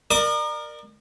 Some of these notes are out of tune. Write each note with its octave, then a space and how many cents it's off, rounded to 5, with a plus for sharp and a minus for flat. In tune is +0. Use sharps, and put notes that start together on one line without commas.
A#4 +5 D5 +30 D#6 -45